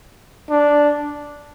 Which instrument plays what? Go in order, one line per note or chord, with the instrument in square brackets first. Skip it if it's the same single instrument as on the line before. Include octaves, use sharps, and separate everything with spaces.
[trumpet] D4